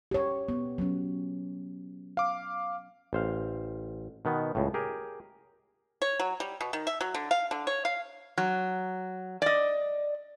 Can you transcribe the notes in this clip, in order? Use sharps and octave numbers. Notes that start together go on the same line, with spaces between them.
G4 C#5
B3
F#3 C#4
F5 D6
A1 C5 F5
B2 D#3 B3
C#2 A2
G4 G#4 A#4
C#5
F#3
G3
B2
D#3
E5
F#3
D3
F5
D3
C#5
F5
F#3
D5 D#5